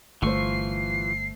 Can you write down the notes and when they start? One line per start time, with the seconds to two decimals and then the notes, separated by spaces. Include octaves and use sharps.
0.22 G1 E3 A3 F4 C5 C#6 C7